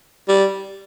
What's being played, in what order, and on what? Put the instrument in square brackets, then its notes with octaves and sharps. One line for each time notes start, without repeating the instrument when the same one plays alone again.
[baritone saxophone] G3